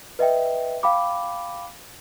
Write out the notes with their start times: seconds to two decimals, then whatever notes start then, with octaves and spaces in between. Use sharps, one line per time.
0.19 B4 D#5 E5 G5
0.83 F5 G5 B5 D6